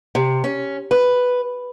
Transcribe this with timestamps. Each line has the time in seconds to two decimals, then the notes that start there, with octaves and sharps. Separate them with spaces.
0.15 C3
0.44 C#4
0.91 B4